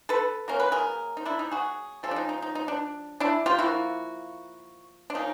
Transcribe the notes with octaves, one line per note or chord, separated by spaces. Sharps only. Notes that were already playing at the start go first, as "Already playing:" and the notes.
A4 B4
F#3 A#3 C#4 A#4
B4
G#4 A#4
D#4
D4 E4
D#4
F#4 G#4
F3 G#3 C#4 G4 A4
D4
D#4
D#4
D#4
D#4
D4
D4 E4
F4 G4
D3 F3 A#3 E4 F#4
D4
F3 A#3 C#4 D#4